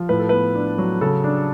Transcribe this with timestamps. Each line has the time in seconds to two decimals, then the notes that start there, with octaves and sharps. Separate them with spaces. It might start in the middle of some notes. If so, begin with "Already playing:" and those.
Already playing: F3
0.09 A2 B4
0.19 A4
0.29 B3 B4
0.55 D4
0.78 F#3
1.01 C#3 A4
1.24 D4